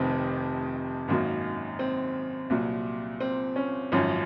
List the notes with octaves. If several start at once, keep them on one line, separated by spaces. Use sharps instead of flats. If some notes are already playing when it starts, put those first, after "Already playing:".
Already playing: F1 F2 C3 D#3 C4
G#1 F#2 D#3 F#3 A#3
C4
C2 A#2 F#3
C4
C#4
G#1 F#2 F3 C#4